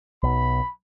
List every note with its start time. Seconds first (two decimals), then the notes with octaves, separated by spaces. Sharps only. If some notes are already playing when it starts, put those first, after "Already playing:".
0.23 B1 B5